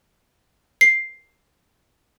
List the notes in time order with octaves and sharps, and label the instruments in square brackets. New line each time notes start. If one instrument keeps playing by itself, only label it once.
[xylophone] C7